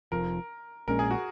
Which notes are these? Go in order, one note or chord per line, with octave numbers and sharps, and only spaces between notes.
F1 F2 F3 A#4
A#1 A#2 G#3 C#4 A#4
G#4
F#4